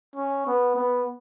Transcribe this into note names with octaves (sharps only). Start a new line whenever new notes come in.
C#4
B3
B3